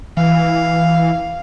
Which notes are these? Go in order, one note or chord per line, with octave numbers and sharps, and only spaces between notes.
E3 F5